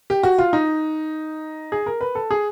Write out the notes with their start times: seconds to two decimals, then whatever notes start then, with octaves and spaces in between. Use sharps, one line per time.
0.10 G4
0.23 F#4
0.38 F4
0.53 D#4
1.72 G#4
1.86 A#4
2.01 B4
2.15 A4
2.31 G#4